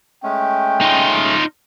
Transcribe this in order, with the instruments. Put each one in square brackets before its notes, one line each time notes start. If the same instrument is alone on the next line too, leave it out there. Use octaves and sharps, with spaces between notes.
[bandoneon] G#3 A3 C#4 [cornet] G5
[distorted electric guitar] D#4 F4